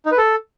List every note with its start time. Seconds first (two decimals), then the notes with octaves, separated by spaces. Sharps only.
0.06 D#4
0.12 B4
0.18 A4